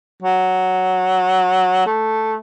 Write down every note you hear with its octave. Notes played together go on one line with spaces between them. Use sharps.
F#3
A3